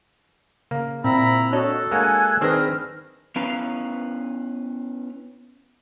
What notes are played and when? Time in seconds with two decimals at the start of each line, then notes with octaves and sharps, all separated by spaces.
0.71 C#3 A#3
1.04 A#2 C4 E4 A#5 B5
1.52 D4 F#4 A4 C#5 D#5 F#6
1.91 G#3 A#3 F#4 G#5 F#6 G#6
2.41 D#3 C4 D4 G#4 B4 E6 F6 A#6
3.36 B3 C#4 E4 B4 F5 A#5